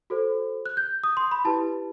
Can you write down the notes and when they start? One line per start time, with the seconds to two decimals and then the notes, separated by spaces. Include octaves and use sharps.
0.10 F#4 A4 C5
0.66 F#6
0.77 G6
1.04 D#6
1.17 C6
1.31 B5
1.45 E4 G4 B4 A5